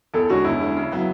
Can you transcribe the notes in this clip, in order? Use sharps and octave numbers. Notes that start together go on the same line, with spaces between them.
E2 A4
D3 G#3 C#4 F#4
E2 E4
D3 G#3 C#4
C#3
F#3 B3 E4